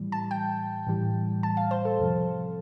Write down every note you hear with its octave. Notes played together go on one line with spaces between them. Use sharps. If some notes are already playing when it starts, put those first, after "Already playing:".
Already playing: A2 E3 G3
A5
G5
A2 E3 G3
A5
F5
C5
A4
F2 C3 F3